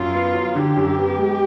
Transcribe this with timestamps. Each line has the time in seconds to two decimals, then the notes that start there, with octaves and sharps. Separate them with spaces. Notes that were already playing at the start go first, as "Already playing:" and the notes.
Already playing: F#2 F4
0.14 B3
0.34 F#3
0.55 D3 G4
0.76 F#2
0.98 B3
1.18 G#3